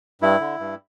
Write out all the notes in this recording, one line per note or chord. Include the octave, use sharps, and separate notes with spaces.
G2 E4
D3
G2